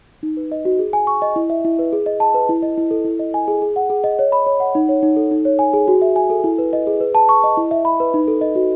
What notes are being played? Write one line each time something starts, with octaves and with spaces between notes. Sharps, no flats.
D#4
B4
D#5
F#4
G#4
G#5
C#6
D#5
E4
E5
E4
B4
G#4
D#5
A5
B4
E4
D#5
E4
A4
E4
D#5
G#5
G#4
G#4
F#5
G#4
D#5
C#5
B5
C#5
F#5
D#4
C#5
D#4
A4
D#4
C#5
G#5
G#4
F#4
E5
G#5
A4
E4
B4
D#5
G#4
B4
A5
C#6
D#5
E4
E5
B5
B4
D#4
A4
D#5
F#4